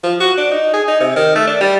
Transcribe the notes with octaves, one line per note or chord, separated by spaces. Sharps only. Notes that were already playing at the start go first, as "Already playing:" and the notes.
F3
F#4
D4
D#4
G#4
D#4
C3
D#3
A3
D4
G3